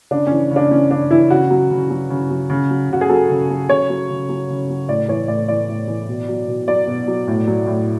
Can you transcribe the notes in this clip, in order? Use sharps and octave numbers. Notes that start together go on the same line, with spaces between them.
C#3 D4
E3 C#4
C#3
D4
E3 C#4
C#3 D4
E3 E4
C#3 F#4
F#3
C#3
F#3
C#3
F#3
C#3
F#3
C#3 F#4
G#4
F#3 A4
C#3
F#3
C#3 C#5
F#3
C#3
F#3
C#3
F#3
A2 D5
E3 C#5
A2 D5
E3 D5
A2
E3
B2
F#3
B2
F#3 D5
B2
F#3
A2
F#3
A2